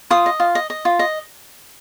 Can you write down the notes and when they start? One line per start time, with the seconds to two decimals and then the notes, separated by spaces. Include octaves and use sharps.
0.10 F4 D#6
0.26 D#5
0.40 F4
0.55 D#5
0.70 D#5
0.85 F4
0.99 D#5